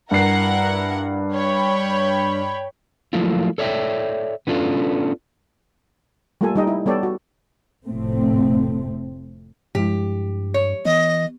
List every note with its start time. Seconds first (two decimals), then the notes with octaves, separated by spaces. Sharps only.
0.11 G2 E4 A#4 F#5 C7
1.34 C#5 G5 B5
3.13 F3 F#3 A3 A#3 E4 F4
3.58 A4 C#5 D5 E5 F5 G5
4.47 B3 C#4 D4 F4 A4 F5
6.41 G3 A3 A#3 F4 A4 G#5
6.56 G3 D#4 D#5 G5
6.67 E4
6.86 G3 B3 A4 C#5 D5 G5
7.03 F#4
7.85 F1 A2 A3 C4
9.75 G2 F3 G#3 E4 G4
10.54 C#5
10.85 E3 B3 D#5